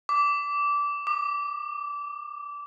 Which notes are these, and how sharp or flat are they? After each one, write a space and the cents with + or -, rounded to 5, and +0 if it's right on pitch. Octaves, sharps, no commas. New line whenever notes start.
D6 -20
D6 +30